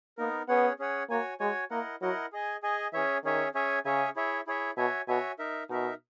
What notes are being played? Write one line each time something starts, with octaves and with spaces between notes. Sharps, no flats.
A#3 B3 D#4 A#4
B3 C#4 G#4 C#5 F#5
C#4 G#4 C#5 F#5
A#3 F#4 C#5 G#5
G#3 F#4 C#5 G#5
A#3 E4 A#4 D#5 F#5
F#3 E4 A#4 D#5 F#5
G#4 D#5 G#5
G#4 D#5 G#5
E3 C#4 G#4 C#5 E5
D#3 C#4 G#4 C#5 E5
C#4 G#4 C#5 E5 G#5
C#3 C#4 G#4 C#5 E5 G#5
E4 G#4 C#5 E5
E4 G#4 C#5 E5
B2 F#4 C#5 E5 G#5
B2 F#4 C#5 E5 G#5
D#4 A#4 E5
B2 D#4 A#4 E5